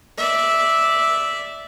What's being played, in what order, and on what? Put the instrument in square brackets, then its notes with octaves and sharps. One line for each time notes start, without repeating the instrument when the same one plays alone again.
[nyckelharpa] D5 E5